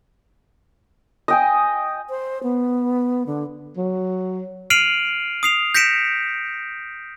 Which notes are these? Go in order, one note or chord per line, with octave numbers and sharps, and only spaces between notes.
D#5 G5 G#5
C5
B3
D3
F#3
F6 C7 D7 D#7 F7 F#7
D#6 C7 F7
G6 A#6 B6 C#7 D7 E7